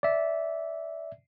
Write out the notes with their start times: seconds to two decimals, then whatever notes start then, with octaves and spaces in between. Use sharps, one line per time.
0.03 D5 E5